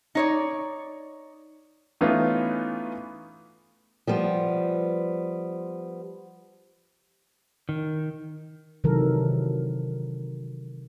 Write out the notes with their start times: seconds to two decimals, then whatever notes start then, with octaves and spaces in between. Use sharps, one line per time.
0.15 D#4 C#5 D5
2.01 E3 A3 B3 C#4 D#4 F4
4.07 F3 G3 B3
7.69 D#3
8.84 C3 D#3 E3 F#3 A4 A#4